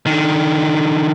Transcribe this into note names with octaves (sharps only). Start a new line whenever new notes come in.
D3 D#3